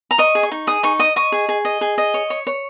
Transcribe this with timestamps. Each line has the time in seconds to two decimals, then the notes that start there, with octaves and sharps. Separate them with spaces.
0.11 A#5
0.18 D#5 C#6
0.35 G#4
0.43 C#6
0.51 D#4
0.67 G#4 D#6
0.83 D#4 C#6
0.99 D#5 D#6
1.16 D#5 C#6
1.32 G#4
1.49 G#4
1.65 D#5
1.81 G#4
1.98 D#5
2.14 C#5
2.30 C#5
2.47 C#5